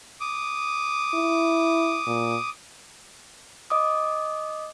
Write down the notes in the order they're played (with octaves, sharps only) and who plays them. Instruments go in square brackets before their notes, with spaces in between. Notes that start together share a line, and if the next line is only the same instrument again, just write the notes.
[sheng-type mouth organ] D6 D#6
[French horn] E4
A#2
[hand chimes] D#5 D6 D#6